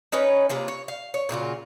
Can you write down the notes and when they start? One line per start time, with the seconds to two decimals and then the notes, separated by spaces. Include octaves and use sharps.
0.12 C#4 D#4 B4 C#5
0.49 C3 A#3 F4 G#4
0.68 C#5
0.88 F5
1.14 C#5
1.29 A#2 C#3 F4 F#4